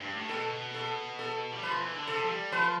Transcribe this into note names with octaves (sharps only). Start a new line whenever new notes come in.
G2
A2
B2 A4
A4
A4
G3
F3 B4
E3
D3
C3 A4
F3
G3
F3 B4